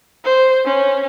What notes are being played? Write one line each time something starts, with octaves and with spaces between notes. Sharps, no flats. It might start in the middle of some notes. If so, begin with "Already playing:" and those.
C5
C#4